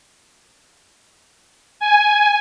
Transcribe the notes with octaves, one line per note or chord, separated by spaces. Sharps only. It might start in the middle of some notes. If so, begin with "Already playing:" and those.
G#5